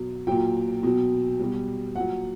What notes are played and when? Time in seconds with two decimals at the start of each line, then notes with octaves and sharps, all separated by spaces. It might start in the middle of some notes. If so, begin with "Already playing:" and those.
Already playing: B2 F#3
0.27 A#2 F#3 G5
0.83 B2 F#3
1.40 B2 G3
1.96 A#2 F#3 F#5